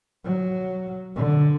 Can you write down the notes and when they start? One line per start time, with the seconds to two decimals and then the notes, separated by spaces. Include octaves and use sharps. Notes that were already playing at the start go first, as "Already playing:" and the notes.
0.25 F#3
1.16 D3